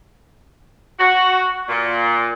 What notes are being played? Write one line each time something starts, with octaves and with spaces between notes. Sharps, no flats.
F#4
A#2